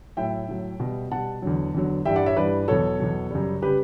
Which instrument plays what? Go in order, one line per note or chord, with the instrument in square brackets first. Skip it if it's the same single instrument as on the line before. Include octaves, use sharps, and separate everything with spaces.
[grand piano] A2 F#3 E5 G5
A2 F#3
B2 G3
B2 G3 F#5 A5
E2 D3 F#3
E2 D3 F#3
G2 E3 G3 E5 G5
D5 F#5
C#5 E5
G2 E3 G3 B4 D5
E2 B2 F#3 A4 C#5
E2 B2 F#3
F#2 C#3 G3
C#3 G3 G4 B4